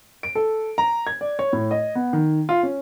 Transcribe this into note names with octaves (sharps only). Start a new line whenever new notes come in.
D7
A4
A#5
G#6
D5
C#5
A2
D#5
B3
D#3
F4
C#4